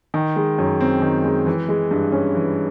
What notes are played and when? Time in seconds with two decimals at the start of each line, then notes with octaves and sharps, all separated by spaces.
0.14 D#3
0.36 G#3
0.58 F#2
0.81 C4
1.02 D#3
1.24 G#3
1.46 E3
1.69 G#3
1.91 G2
2.12 C#4
2.35 E3